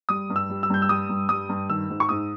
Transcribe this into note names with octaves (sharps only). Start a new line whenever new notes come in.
G3 D#6
G2
E6
G3
E6
G2 G6
E6
G3 D#6
G2
G3 D#6
G2
D#3 E6
G#2
C#6
G#2 D#6